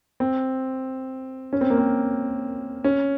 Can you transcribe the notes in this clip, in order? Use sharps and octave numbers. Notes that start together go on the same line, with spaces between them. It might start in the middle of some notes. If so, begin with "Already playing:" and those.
C4
C#4
C4
A#3
C4
C#4